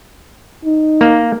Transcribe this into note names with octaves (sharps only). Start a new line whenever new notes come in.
D#4
A#3